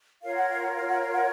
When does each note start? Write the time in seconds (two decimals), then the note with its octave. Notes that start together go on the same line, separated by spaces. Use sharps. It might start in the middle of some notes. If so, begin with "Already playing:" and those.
0.22 F4 A#4 C#5 F5
0.35 F#5
0.48 F5
0.61 F#5
0.74 F5
0.87 F#5
1.00 F5
1.12 F#5